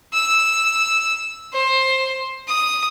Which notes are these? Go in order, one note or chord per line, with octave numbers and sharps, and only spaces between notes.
E6
C5
D#6